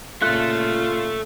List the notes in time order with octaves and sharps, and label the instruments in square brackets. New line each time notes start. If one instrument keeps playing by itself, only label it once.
[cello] A#2 C#3 [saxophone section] F4 [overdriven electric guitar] A4 E5 [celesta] F#6